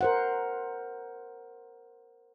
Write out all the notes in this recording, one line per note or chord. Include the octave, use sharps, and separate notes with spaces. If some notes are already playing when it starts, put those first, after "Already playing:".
A#4 C5 F#5